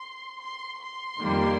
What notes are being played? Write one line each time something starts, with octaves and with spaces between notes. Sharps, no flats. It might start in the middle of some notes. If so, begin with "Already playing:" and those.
Already playing: C6
C6
C6
F2 D#3 G3 A#3